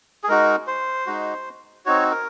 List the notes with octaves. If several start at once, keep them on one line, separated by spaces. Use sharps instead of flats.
G#4
G#3 D#4 F#4 A#4
C5
G#3 D#4 F#4
C4 D#4 F#4 C#5
A#4